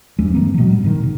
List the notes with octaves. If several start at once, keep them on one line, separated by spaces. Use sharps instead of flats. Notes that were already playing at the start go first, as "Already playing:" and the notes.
E2 G2 F#3 G#3
G2 E3 A#3 C4
B2 F#3
A2 G3
A1 G#2 D#3
C#3